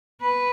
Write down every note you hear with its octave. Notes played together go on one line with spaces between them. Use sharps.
B4